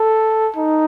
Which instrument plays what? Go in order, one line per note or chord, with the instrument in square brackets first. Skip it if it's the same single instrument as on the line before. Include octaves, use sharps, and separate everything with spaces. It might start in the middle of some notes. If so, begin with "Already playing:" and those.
Already playing: [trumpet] A4
D#4